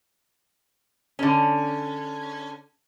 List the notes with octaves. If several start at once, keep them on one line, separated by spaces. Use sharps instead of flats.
D3 C#4